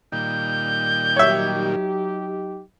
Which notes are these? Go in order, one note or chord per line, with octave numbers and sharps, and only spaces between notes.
A#2 D#3 G3 G6
F#3 D#4 G4 C#5 E5